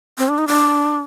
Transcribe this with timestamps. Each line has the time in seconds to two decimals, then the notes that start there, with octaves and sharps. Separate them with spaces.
0.18 C4
0.29 D4
0.38 D#4
0.47 D4